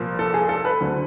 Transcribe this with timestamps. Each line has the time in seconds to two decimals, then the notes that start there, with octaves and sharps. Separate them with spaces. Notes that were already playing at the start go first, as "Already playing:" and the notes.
Already playing: C2 A#2 F3 A#3
0.19 A4
0.34 G#4
0.49 A4
0.65 B4
0.80 D2 D3 F#3